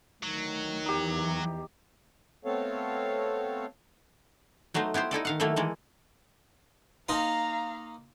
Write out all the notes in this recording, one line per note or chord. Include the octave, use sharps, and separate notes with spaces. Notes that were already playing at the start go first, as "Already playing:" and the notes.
D2 D#3 F#3
E2 E3 D#4 G4
A3 B3 C4 A4 C#5 F5
F#3 A3 B3 D#4 C5
B3 E4 G4 C5
D#4 E4 A4 D5
D#3 F5 F#5
D#3 F#3 A3 A#3 E4 A4
E3 G#3 A#3 A4
A#3 D#4 F5 A#5 C6